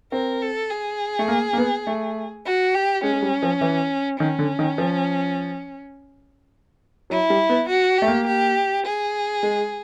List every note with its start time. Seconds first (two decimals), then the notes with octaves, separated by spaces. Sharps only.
0.12 C4 A#4
0.42 A4
0.70 G#4
1.19 A3
1.28 A#3
1.53 A#3
1.58 B3
1.87 A3
2.45 F#4
2.74 G4
3.03 G#3 C#4
3.13 G#3
3.22 G3
3.43 F3
3.61 E3
4.20 D#3 C#4
4.39 D3
4.59 D#3
4.78 F3
7.10 F#3 E4
7.30 G3
7.49 B3
7.69 F#4
7.98 A3 G4
8.08 A#3
8.27 G4
8.86 G#4
9.43 G#3